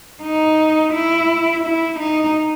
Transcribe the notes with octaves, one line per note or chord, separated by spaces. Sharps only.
D#4
E4
E4
D#4